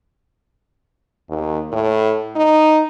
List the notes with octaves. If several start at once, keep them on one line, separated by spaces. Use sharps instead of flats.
D#2
A2
D#4